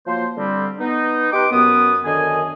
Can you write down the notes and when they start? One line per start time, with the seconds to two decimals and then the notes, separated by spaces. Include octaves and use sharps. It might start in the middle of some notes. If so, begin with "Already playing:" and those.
0.07 F3 F#3 A#3 C5
0.37 D3 G3 C4
0.79 B3 D#4
1.32 D#4 G4 B4 G5 C6 D6
1.52 F#2 B3 D#6
2.04 F#2 D3 D#3 G#4 D#5 G#5